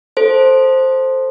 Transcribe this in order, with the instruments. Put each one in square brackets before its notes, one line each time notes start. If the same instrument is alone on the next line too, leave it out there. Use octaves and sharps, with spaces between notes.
[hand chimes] A4 C5